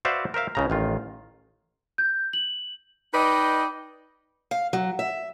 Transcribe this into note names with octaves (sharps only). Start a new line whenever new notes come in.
F#4 B4 C5 D5 E5 F5
A#4 C5 E5 F5
C#2 C#3 A#5
A1 D#3 F4
G6
F#7
D#4 B4 D5 D#5 G5
F5
F#3
E5